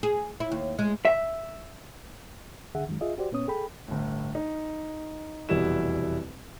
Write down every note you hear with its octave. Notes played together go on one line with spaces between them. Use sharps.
G#4
E4
D#2
G#3
E5
C#2 D3 G#4 E5 F#5
F#2 D#3 F#3 G#3
F4 G#4 D#5 E5
F#4 G4 C5 D5
A#2 B3 C#4 C#5 D#6
G#4 A4 G5 B5
G1 A2
D#4
F1 E2 B2 G3 E4 E7